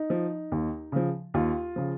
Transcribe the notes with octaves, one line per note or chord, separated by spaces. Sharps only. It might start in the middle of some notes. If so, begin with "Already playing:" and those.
Already playing: D#4
F3
D#2
C#3 F3
D#2 F4
C#3 F3